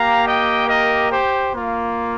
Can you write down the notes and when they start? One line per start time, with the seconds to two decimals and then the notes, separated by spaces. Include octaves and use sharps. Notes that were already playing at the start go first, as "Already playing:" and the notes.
Already playing: A#3 G4 F5 A#5
0.26 D#5 G5
0.68 A#4 D#5
1.10 G4 C5
1.53 A#3 F4